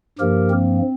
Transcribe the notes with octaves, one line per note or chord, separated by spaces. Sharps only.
G2 F3 A#3 G4 A#4
C4